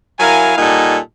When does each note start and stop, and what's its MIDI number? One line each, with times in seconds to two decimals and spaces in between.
0.19 0.54 54
0.19 0.54 64
0.19 0.54 70
0.19 0.54 77
0.19 0.54 80
0.57 0.98 46
0.57 0.98 55
0.57 0.98 63
0.57 0.98 69
0.57 0.98 78
0.57 0.98 80